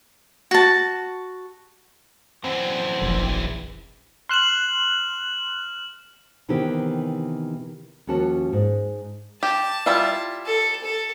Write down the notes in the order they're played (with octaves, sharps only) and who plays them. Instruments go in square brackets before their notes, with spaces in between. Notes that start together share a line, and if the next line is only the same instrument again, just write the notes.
[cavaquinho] F#4 A5
[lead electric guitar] F#2 E3 [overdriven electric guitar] C4
[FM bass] F1 [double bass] A#1
[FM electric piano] C6 F#6 [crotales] F6 E7 F#7
[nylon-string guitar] C3 D#3 E3 B3 E4 G4
D#2 F3 C#4 F#4 A5
G#2
[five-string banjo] G4 [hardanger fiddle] A5
[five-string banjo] G3 E4 F4
[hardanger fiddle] A4
A4